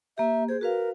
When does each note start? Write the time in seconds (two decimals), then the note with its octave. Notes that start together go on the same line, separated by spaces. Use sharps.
0.18 A#3 G4 E5
0.49 G#4 C5
0.61 F#4 A#4 B4 F5